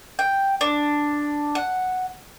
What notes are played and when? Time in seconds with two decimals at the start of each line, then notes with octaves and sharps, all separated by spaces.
0.19 G5
0.61 D4
1.55 F#5